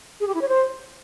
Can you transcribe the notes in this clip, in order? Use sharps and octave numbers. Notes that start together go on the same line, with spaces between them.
G#4
G4
E4
C#5
C5